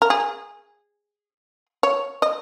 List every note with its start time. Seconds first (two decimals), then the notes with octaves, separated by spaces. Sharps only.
0.02 A#4
0.10 G#4
1.83 C#5
2.22 D#5